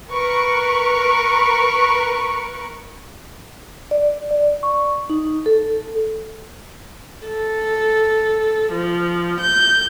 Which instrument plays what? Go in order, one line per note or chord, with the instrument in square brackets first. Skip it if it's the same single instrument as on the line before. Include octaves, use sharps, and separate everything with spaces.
[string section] A#4 B4 C#6
[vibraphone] D5
D5
C#6
D#4
A4
[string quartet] A4
F3
G6